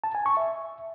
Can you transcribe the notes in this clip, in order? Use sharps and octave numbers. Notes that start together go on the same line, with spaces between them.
A5
G#5
C#6
E5